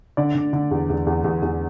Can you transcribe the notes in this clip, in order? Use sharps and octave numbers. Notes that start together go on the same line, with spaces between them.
D3 D5
D3
D3
E2
E2
E2
E2
E2